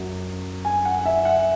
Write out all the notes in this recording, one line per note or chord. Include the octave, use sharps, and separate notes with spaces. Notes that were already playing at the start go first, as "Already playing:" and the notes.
Already playing: F#2 F#3
G#5
F#5
E5
F#5